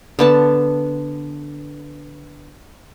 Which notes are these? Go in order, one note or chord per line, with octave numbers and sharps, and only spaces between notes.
D3 B3 A5